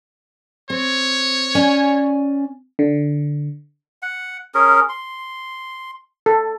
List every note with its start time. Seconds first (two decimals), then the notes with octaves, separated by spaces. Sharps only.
0.70 C4 C#5
1.55 C#4 D5 G#5
2.79 D3
4.02 F#5
4.55 C#4 G#4 A#4
4.89 C6
6.26 A4